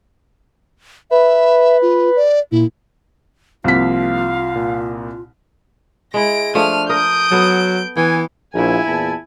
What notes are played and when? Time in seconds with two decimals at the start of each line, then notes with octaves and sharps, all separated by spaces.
1.11 B4 E5
1.82 F4
2.16 D5
2.52 A#2 E4
3.64 C2 F3 A#3 F4 F5 B6
4.55 A#2
6.14 G#3 E4 A#6 D7
6.55 F3 A3 D4 F6 D#7
6.90 A#4 D#6 G6 D7
7.31 F#3 B3 A4
7.97 E3 B3 G5 G#5
8.54 A#1 E4 G#5
8.87 E2 A#2 A5